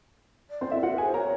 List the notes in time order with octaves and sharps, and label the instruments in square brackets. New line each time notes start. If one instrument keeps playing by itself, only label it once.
[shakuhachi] D5
[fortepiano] C4 C5
[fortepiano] E4 E5 [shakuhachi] A4
[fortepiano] F#4 F#5 [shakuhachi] A#4
[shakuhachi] B4
[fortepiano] G#4 G#5
[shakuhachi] C5
[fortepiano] A#4 A#5 [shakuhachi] C#5